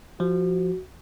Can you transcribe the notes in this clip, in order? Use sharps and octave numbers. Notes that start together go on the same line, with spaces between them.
F3 F#4